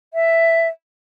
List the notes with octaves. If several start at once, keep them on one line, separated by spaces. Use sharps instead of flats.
E5